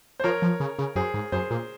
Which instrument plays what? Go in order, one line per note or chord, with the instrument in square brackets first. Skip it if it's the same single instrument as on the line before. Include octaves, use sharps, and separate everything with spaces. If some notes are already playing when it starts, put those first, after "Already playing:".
[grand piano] C5
[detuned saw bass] F3 [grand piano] A#4 C#5
[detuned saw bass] F3
C#3
C#3
[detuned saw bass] F#2 [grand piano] G#4 C5
[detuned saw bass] G#2
[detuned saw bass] F#2 [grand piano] G#4 C5
[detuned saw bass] A#2